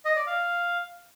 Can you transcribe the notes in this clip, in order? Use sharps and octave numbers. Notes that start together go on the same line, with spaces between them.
D#5
D5
F5